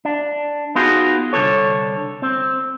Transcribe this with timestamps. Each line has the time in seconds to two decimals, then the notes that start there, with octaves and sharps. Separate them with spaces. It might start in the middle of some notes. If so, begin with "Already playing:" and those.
0.05 D4
0.75 B3 D#4 F4 F#4 G#4
1.33 C2 G2 D3 A4 C#5
2.22 C4